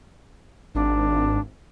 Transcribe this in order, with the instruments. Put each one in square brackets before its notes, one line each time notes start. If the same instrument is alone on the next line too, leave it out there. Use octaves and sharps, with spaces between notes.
[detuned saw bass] G#1 [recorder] D4